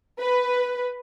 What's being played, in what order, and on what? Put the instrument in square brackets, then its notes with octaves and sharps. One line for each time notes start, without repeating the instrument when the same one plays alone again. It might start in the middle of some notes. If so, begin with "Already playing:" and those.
[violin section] B4